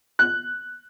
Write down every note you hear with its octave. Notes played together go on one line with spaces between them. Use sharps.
F#6